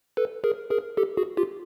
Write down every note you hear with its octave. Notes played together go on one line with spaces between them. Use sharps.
A4 B4
G#4 A#4
G#4 A#4
G4 A4
F#4 G#4
F4 G4